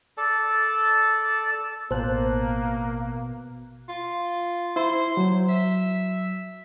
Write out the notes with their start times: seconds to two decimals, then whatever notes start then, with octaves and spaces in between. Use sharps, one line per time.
0.17 A4 D5 A5
1.91 A1 B2 A#3 C5 A5 F#6
3.89 F4
4.76 E4 C5
5.17 F#3
5.49 E5